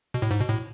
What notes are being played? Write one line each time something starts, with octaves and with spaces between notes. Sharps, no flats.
B2
A2
G#2
B2
A2